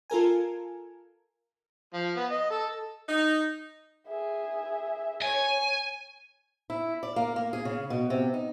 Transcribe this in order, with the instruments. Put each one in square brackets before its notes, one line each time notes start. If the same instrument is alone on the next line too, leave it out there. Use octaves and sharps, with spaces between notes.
[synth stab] F4 A4 A#4 G#5
[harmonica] F3
B3
D#5
A4
[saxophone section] D#4
[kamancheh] G#4 E5
[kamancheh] C#5 [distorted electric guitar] G#5
[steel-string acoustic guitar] E4
D5
A#3
A#3
G#4
C#3
B2
C3
D#4